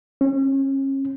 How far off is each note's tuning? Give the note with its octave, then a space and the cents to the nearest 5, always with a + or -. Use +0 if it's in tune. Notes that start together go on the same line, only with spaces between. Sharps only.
C#4 -35